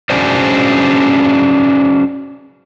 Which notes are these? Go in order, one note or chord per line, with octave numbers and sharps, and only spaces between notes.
C#4 D4 F#4 G#4 C5 D5